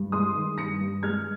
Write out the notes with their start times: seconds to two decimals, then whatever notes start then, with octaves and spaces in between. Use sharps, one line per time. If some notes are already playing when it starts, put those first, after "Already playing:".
Already playing: G2
0.12 G#3 C6 D#6
0.35 D#3
0.58 G2 A#6 C#7
0.81 G2
1.03 G#3 F6 G#6